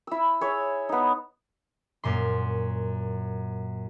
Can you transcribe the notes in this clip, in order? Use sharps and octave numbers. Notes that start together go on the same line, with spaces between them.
E4 E6
G#4 C#5 E5
B3 D#4
F#2 A#2 C6